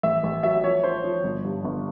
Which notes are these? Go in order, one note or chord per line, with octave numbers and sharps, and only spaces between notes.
A1 E5
A1
F#3 E5
F3 C#5
F3 C5
F3
G1
G2
G1